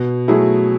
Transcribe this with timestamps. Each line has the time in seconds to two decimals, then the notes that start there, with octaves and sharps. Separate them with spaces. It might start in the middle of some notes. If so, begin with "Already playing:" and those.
Already playing: B2
0.28 F#3 A3 E4 G#4